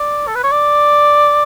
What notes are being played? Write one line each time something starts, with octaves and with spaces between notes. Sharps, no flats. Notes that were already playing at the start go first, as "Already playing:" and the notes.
Already playing: D5
A4
B4
C#5
D5